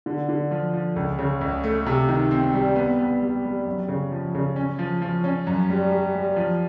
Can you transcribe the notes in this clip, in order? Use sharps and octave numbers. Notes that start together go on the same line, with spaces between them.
D3
D3
F3
F3
C#2
C#3
C#2
A3
C3
D#3
C4
G3
B3
B3
G3
G3
F#2
C#3
F3
C#3
C#4
F3
F3
C#4
F#2
G3
G3
G3
F3